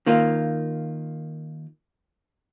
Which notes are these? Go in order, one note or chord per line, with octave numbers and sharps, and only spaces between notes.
D#3 A#3 F4